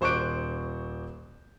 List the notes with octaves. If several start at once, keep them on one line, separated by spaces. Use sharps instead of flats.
D#1 C5 C#6 D6 F#6 D7